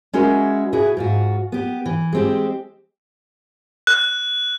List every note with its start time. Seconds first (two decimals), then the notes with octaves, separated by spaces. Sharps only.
0.13 G#3 C#4 E4 F#4 A#4
0.73 B2 E4 F#4 G#4
0.97 G#2 F4 F#4
1.52 B3 G4
1.86 E3
2.13 G#3 C4 G4
3.87 F#6